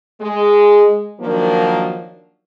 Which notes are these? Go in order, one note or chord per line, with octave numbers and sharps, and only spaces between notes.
G#3
D#3 F3 F#3 A#3 D4